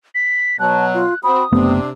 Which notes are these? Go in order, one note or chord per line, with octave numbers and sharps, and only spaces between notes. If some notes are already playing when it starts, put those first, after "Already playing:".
B6
B2 F#3 A5 F#6
F4
C4 F#4 B5 D#6
F#1 C3 A3 B3 D4